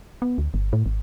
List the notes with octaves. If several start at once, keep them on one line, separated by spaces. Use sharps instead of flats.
B3
D2
G1
A2
G#1